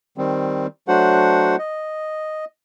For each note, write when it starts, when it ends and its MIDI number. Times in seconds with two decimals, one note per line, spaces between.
0.18 0.67 51
0.18 0.67 55
0.18 0.67 60
0.88 1.56 54
0.88 1.56 57
0.88 1.56 62
0.88 1.56 66
0.88 1.56 72
0.88 1.56 78
1.59 2.45 75